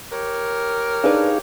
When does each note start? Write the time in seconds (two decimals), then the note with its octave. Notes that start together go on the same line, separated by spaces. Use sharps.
0.12 G4 A#4 C#5
1.04 D4 D#4 G#4 B4 F5